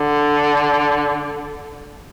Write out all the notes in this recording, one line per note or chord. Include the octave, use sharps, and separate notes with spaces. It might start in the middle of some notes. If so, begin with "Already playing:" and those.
Already playing: D3